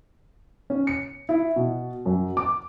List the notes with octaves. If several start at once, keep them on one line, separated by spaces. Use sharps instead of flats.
C#4
C#7
E4
B2
F#2
D6